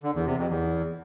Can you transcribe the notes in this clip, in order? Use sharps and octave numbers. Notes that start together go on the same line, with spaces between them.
D3
E2
C3
F2
E2